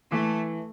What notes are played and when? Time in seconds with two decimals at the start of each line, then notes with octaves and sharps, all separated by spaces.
0.12 E3 A3